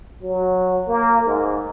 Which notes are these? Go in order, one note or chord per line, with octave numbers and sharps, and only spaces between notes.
F#3
A#3
G#2